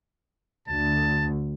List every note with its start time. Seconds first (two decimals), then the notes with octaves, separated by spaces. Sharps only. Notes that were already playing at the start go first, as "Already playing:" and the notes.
0.68 D2 A5